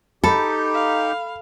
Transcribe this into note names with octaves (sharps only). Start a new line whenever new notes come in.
D#4 G4 A4 B5
F5